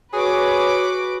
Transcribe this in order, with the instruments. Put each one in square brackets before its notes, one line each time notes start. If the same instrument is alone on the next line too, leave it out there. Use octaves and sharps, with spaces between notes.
[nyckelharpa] F#4 [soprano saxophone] G#4 [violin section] B4 D6 [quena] C#5